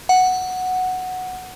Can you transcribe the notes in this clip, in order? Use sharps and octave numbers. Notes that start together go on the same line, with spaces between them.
F#5